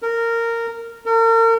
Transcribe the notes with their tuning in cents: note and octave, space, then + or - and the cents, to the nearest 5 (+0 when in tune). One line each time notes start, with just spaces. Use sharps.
A#4 -15
A#4 -40